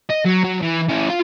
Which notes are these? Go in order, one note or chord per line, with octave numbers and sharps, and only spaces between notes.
D#5
F#3
F#3
E3
C#4 E4
F4